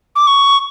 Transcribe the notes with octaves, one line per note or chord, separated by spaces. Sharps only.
D6
C#6